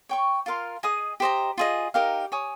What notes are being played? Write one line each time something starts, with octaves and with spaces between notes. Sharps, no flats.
C#5 G5 C#6
F4 A#4 F5 C6
G#4 D#5 G#5 D#6
G4 C5 D#5 A#5
F4 G#4 D#5
D#4 G4 A#4 F5
C#5 G#5 D#6